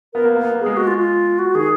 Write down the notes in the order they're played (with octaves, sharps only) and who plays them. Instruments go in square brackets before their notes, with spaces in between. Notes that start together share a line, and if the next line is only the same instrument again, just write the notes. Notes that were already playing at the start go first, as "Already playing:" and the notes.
[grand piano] B3 [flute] A#4
[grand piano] A#3
A#3
B3
A#3
[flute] G#4
[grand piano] G#3
[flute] F#4
F4
F4
F#4
[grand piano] D#3 [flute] G#4